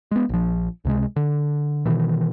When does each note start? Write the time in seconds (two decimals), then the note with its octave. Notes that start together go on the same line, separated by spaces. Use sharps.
0.11 G#3 B3
0.29 A#1 F3
0.85 C#2 C3 G#3
1.16 D3
1.86 B2 D#3 E3